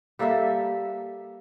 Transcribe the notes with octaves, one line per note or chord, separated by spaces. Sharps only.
G3 A#3 A4 E5